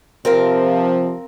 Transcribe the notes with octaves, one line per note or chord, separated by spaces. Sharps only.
C3 F3 C4 A#4 F5